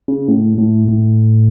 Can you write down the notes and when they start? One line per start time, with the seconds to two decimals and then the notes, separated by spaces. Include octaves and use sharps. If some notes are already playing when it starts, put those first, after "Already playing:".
0.08 C#3
0.28 A2
0.58 A2
0.88 A2